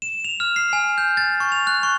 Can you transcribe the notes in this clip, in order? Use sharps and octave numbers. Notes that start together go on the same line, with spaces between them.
E7
F7
F6
C7
G#5
G6
A6
C#6
F7
F#6
C#6